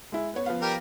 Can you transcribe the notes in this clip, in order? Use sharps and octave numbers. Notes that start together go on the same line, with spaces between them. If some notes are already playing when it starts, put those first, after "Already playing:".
G#3 E4
B3 C#5
F3 B3 F5
G3 A#4 G5